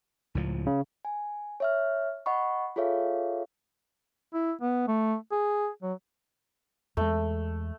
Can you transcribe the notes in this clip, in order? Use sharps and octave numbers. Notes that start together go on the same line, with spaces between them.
C#2 A2 F3
C#3
G#5
C#5 E5 F6
D#5 F#5 B5 C#6
F4 G#4 A4 C#5 E5 F5
E4
B3
A3
G#4
F#3
E2 G#3 A3